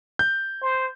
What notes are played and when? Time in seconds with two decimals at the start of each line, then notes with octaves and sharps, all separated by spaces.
0.19 G6
0.61 C5